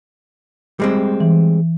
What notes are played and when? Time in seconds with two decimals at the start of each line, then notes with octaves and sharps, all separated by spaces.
0.80 G3 G#3 C4
1.20 E3